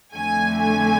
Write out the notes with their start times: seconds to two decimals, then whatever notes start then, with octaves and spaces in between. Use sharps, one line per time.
0.14 F2 D3 A3 G#5
0.61 G#5